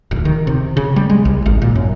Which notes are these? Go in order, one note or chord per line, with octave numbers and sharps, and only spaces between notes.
D1
D#3
C3
C#3
G3
G#3
C2
G#1
A#2
F#2